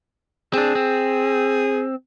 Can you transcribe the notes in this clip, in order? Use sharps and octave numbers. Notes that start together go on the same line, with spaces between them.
C4 D4 G#4
C4